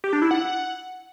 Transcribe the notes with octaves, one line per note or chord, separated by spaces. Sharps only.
G4
D4
E4
F#5